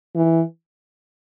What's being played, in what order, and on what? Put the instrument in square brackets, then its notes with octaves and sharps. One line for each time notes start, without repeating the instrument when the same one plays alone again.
[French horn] E3